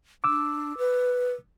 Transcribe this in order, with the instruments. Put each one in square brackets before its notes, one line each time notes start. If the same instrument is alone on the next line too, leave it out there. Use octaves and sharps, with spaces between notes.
[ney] D4 [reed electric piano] D6 E6
[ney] B4